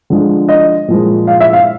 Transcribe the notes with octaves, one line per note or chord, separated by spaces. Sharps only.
D3 F3 G#3
D#5
A#2 F3 G#3
F5
E5
F5